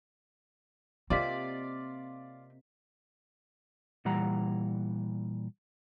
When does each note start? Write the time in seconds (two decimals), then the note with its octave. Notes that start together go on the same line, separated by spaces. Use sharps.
1.10 C3 A#3 C4 F4 D5 D#5 B6
4.05 A#2 E3 G3 F#5 A#5